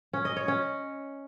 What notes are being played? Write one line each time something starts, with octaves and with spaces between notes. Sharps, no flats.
C#4
D#5
C#5
C#4